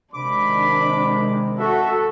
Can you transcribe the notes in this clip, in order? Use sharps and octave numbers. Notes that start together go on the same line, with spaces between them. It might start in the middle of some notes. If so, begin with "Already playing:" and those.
C3 D#3 G#3 D4 B5 D6
F#4 A4 E5